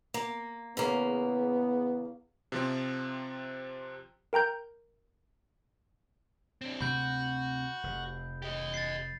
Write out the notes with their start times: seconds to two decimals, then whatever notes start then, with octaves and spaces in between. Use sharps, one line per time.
0.14 A#3
0.77 E2 C#3 A#3 B3
2.52 C3 F3 C4
4.33 A#4 G5 A#5 G6
6.62 C4 D4
6.81 D2 C3 C4 F#4 B5 G6
7.83 F1
8.42 G4 D#5
8.74 A6 C7